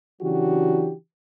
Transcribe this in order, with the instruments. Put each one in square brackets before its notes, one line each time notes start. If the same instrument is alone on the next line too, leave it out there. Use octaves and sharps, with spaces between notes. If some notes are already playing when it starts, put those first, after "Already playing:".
[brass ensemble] C#3 E3 F#3 D4 F#4 G4